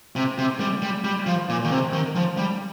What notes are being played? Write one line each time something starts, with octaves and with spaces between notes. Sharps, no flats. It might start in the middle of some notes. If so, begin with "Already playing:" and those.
C3
C3
G3
G3
G3
F3
A#2
D#3
C3
D#3
F3
G3